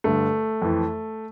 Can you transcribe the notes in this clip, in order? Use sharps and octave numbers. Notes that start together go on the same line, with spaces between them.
G2 D3 A3
F2 E3